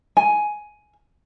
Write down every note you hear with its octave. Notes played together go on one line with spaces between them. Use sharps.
G#5